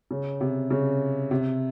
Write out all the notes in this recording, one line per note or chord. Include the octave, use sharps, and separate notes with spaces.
C#3
C3
C#3
C3